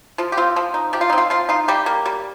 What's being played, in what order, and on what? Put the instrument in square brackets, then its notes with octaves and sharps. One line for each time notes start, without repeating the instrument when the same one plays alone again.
[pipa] F3 F4
G4
C4 F4
F3
D#4
F3 G4
F4
C4 D#4
F4
F3 F4
D#4 F4
G3 G4
A#3
G3